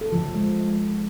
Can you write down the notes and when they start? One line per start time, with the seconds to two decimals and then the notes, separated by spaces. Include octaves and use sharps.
0.01 A4
0.13 F3
0.24 F3
0.35 G#3